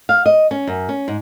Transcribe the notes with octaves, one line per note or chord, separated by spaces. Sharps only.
F5
D#5
C#4
F#2
C#4
G#2